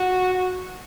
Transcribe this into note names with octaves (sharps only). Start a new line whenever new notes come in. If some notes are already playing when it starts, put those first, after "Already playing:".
Already playing: F#4